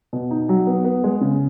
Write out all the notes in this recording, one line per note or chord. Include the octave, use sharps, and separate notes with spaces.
B2
D#4
F#3
B3
B3
G#3
C#3